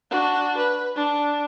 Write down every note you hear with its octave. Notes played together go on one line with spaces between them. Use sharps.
D4 F#4
B4
D4